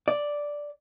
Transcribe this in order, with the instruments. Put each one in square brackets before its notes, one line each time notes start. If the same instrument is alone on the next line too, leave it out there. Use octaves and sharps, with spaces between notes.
[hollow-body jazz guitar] D5